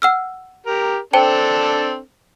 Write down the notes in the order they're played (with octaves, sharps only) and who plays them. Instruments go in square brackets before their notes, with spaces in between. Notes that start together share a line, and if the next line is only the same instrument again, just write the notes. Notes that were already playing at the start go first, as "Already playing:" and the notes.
[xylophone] F#5 E6 F6
[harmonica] G4 A#4
[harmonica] C4 D4 A4 [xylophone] C5 G5 A5